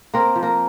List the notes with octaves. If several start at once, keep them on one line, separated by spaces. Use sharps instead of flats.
A#3 C4 A#4
F3
A#3 A#4